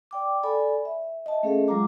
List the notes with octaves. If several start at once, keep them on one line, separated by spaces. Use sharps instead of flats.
D5 G5 D6
A4 D5 G#5 B5
E5
D#5 E5 A5
A3 C#4 G#4 A4 D#5 F5
F#3 G#3 F4 A#5 D6